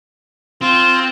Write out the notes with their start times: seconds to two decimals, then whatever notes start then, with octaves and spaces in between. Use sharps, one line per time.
0.61 C4 F4